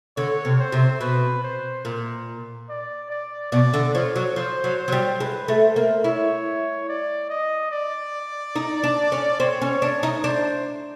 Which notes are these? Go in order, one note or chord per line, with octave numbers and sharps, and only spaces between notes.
D3 C#5
C3
C5
C3
B2 B4
C5
A#2
D5
D5
B2 D5
D3
F3 C#5
F#3
F3 C5
F#3
C5
F#3
G3
G#3 B4
A3
C5
A#3
E4 C#5
D5
D#5
D5
D#4
D4
C#4
C4 C#5
C#4
D4
D#4
D4 C5